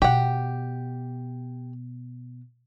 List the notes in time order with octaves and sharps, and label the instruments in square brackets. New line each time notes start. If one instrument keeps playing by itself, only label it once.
[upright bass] B2 [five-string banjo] G4 F#5